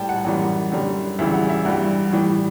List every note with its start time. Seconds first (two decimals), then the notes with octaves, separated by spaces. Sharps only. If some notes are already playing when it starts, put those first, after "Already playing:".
Already playing: A2 G3 G5 A5
0.09 F#5
0.25 F#2 E3 G3 F#5
0.72 F#2 D3 G3
1.19 D2 C#3 E3 G3 E5
1.33 F#5
1.49 E5
1.65 G2 E3 G3 F#5
2.12 A2 E3 G3